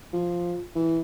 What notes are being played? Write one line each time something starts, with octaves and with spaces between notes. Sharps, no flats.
F3
E3